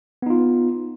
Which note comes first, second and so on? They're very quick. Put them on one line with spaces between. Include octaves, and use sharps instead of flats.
B3 D#4 F4